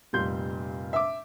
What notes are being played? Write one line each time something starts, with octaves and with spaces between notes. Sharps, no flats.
F1 A#2 G3 C6 G6
E5 D6